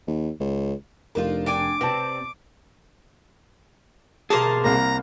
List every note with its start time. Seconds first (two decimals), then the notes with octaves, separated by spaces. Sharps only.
0.07 D#2
0.40 C#2
1.15 F1 D4 D#4 F4 A#4
1.46 D4 G5 G#5 D6
1.81 C3 C4 B4 D5 A5
4.30 B2 G4 G#4 A#4 C5 A5
4.64 C2 A#3 A#5